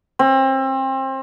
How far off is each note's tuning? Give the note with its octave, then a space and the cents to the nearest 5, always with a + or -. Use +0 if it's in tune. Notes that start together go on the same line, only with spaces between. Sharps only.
C4 +30